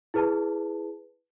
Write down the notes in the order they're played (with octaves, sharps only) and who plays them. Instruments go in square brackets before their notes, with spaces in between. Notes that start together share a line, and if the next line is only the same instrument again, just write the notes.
[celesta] E4 G#4 B4 A5